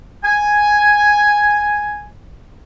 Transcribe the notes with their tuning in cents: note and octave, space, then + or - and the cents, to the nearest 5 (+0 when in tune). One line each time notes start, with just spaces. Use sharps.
G#5 +0